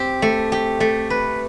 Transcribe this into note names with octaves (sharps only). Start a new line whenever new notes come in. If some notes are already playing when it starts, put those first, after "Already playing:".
Already playing: C4 G4
A3
G4
A3
B4